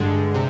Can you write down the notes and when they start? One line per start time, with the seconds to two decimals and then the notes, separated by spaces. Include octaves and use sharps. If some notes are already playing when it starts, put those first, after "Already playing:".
Already playing: G2 D3 G#3
0.34 C3